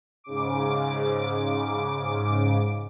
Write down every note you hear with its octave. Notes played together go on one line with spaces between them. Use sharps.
G#2 C#3 D6